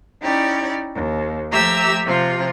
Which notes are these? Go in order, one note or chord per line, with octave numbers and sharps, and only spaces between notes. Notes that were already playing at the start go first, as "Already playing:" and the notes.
C#4 D#4 E4 G4 D5
D#2
F3 A3 G4 E5 A#5 E6
C3 F3 F4